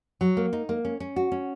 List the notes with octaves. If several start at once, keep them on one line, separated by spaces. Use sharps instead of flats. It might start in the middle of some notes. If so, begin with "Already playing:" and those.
F#3
A#3
D#4
A#3
C#4
C#4
F#4
C#4